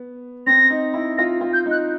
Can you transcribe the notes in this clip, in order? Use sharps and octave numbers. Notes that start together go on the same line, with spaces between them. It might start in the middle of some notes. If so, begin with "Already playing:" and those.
Already playing: B3
C4 A#6
D#4
E4
F4 A#6
F4
G6
D#4
F#6